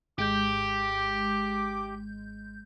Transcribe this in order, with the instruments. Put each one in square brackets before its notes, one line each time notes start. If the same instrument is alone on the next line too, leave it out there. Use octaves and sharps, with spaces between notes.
[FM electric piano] G#1 G#3 G6 [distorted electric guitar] G4 [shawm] D6